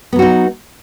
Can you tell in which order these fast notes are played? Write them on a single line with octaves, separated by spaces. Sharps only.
B3 F#3 F#4 D#4